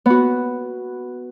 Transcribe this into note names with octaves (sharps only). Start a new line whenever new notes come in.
B3 F#4